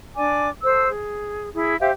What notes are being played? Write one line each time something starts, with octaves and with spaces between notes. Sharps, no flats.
D4 D5 G#5 D6
A4 C5 E6
G#4
E4 G#4
G4 C5 E5 F5